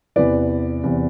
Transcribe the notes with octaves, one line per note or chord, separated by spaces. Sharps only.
E2 C3 E3 B4 D5
E2 C3 E3